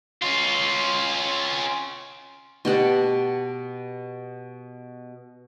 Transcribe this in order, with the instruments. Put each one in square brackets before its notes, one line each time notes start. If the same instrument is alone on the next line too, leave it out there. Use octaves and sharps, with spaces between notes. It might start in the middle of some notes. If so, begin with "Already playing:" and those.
[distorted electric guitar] C#4 F4
[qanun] B2 G4 F#5 A5